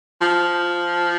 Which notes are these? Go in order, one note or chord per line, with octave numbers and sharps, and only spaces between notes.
F3